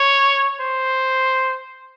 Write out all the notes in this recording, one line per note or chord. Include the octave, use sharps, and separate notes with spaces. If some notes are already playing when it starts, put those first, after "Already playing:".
Already playing: C#5
C5